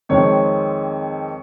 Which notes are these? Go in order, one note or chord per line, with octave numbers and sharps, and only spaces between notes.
F2 D#3 G#3 C4 C#5